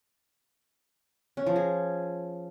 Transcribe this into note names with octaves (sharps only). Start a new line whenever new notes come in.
C#4
F3
G#4